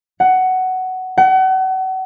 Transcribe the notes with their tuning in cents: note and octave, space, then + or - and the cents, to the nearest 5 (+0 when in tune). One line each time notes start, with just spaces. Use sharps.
F#5 +10
F#5 +35